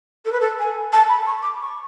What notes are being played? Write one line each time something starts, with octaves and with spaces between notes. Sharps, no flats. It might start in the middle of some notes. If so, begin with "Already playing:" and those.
A4
B4
A4
G#5
A5
B5
C#6
D6
C#6